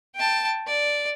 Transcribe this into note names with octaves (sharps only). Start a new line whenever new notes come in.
G5 A5
D5